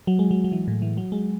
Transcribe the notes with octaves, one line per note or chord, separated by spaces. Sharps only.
F#3
G#3
F#3
F#3
E3
A2
E3
F#3
G#3